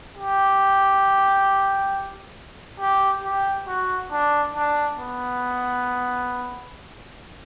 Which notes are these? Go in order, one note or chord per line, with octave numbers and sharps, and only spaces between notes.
G4
G4
G4
F#4
D4
D4
B3